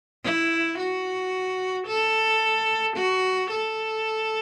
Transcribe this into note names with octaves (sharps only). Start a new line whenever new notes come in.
E4
F#4
A4
F#4
A4